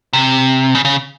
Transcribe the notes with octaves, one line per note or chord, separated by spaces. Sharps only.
C3
C#3
C#3